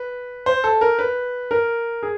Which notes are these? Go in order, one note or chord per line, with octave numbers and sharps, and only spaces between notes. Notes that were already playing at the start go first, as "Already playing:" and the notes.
Already playing: B4
C5
A4
A#4
B4
A#4
G#4